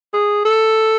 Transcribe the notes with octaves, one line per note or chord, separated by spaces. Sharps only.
G#4
A4